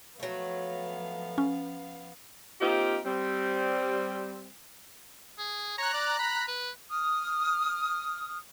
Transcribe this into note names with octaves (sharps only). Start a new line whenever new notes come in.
F3 F#3 A3 B3 F5
C#4
A#3 C4 D#4 F4 G4
G3 C4
G#4
C#5 A#5 F#6
D5
B5
B4
D#6 F6